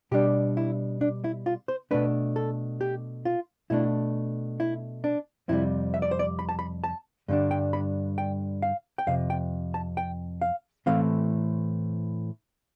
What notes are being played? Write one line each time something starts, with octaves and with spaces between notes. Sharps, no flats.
B2 G3 D4 G4
E4
D4
E4
F4
C5
B2 A3 D4 B4
A4
G4
F4
B2 A3 D4 E4
E4
D4
F2 C3 G3 E4
E5
D5
C5
D5
B5
A5
B5
A5
G2 D3 G3 D4
G5
B5
G5
F5
G5
F2 C3 F5
G5
A5
G5
F5
A2 E3 A3 C4 F5